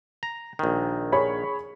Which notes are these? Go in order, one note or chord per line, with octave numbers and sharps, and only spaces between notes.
A#5
A#1 D#3
G#4 C#5 B5